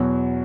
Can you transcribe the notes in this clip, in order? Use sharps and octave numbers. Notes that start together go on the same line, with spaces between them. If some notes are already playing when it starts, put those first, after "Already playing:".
Already playing: E2 B2 F#3